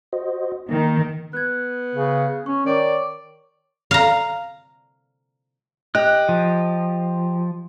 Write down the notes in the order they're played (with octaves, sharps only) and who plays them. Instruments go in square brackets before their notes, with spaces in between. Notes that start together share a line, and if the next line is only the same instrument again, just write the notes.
[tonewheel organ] F#4 C5 D#5
[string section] D#3 [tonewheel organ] A#3
[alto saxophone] B3 [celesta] F#6 G#6
[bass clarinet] C#3
[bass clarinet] C#4 [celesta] C#6
[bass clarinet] D#3 [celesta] C#5 C#6 D6 [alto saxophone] D5
[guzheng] F5 A#5
[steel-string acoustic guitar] G4 D#5 [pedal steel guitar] F#6
[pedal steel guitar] F3